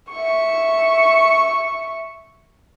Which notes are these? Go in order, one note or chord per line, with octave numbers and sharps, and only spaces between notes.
E5 C#6